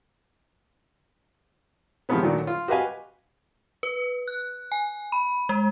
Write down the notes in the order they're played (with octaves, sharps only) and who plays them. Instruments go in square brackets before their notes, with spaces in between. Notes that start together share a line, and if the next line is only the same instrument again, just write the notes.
[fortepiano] C3 D#3 F3 G#3 B3 C#4
A#2 D3 D#3 F#3 A3 C#4
F4
F#4 G4 B4 D#5 F5 G#5
[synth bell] B4
F#6
G#5
B5
G#3